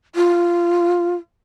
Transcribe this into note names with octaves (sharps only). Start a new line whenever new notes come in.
F4